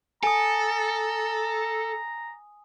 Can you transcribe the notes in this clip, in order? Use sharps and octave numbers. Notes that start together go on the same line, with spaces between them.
A4 G#5 A#5 D#6